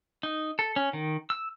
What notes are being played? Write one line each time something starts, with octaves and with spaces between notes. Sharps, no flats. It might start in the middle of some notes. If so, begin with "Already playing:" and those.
D#4
A4
C#4
D#3
E6